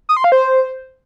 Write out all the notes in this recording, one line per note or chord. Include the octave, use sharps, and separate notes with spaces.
D#6
C6
F5
C5